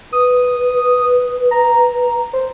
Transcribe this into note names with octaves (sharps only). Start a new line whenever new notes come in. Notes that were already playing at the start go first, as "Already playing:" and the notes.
B4 D#6
A#5
C5